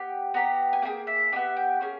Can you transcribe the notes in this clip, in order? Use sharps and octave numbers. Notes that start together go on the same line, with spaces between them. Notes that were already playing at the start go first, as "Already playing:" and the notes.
Already playing: B3 G4
B3 G4 A#5
G#5
A#3 E4 G#4 G5
E5
B3 D#4 G4 E5
G5
A#3 C#4 G#4